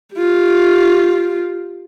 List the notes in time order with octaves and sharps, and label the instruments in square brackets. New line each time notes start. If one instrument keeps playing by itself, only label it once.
[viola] F4 G4